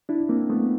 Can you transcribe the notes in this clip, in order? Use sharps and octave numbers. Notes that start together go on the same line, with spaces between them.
D4 E4
A#3 C4
A3 B3